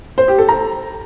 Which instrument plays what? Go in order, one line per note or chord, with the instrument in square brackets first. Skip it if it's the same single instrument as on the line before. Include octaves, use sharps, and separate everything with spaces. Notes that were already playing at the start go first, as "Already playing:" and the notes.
[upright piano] C5
G4
A4
A#5